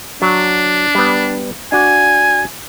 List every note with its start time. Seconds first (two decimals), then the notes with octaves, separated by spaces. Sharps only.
0.22 F#3 D4
0.95 G3 B3
1.72 D4 F#4 G#5